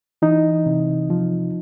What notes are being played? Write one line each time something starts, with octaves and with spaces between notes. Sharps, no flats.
E3 D#4
C3
F3